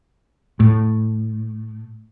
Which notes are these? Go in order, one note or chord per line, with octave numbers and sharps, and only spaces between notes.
A2